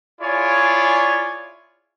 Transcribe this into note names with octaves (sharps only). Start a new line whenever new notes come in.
E4 F4 G#4 C#5 D5 G#5